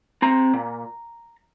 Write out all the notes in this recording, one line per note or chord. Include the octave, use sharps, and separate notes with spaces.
C4 A#5
A#2